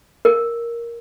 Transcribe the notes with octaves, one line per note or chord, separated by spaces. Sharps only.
A#4